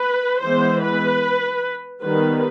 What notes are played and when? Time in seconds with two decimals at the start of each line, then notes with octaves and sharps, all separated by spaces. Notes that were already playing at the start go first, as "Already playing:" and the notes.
Already playing: B4
0.42 E3 G#3 B3 C5
0.83 B4
2.03 D#3 G3 B3 B4